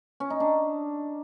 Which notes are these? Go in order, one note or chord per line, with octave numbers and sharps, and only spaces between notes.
C#4
D#4
D4